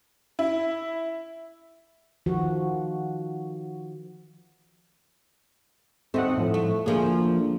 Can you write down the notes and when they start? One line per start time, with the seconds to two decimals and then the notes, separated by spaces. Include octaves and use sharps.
0.39 E4
2.26 D#3 F3 F#4
6.14 D#2 A3 C4 D#5 F#5
6.37 A2 F3
6.54 A3
6.86 D2 F3 A#3 G#4